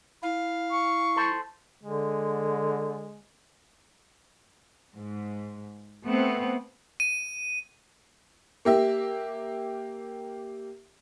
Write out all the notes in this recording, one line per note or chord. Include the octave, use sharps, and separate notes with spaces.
E4 F5
C#6
A4 C5
D3 G#3
G#2
A3 B3 C4
D#7
A#3 G4 E5